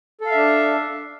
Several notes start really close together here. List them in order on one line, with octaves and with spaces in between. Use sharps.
A4 F5 E5 D4